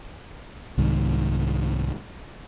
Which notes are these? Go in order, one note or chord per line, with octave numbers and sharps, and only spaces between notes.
C2 G#2 D#3